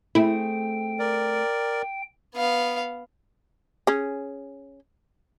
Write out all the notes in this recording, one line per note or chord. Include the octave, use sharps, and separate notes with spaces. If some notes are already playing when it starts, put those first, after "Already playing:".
A3 C4 E4 G#4 G5
A#4 D5
B3 F5
C#4 G#4